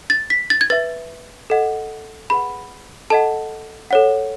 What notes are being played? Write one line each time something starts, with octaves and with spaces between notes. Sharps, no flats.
A6
B6
A6
G#6
B4 E5 A6
A4 D#5 F#5
G#4 B4 F#5 B5
A4 D#5 F#5 A5
A4 C#5 F#5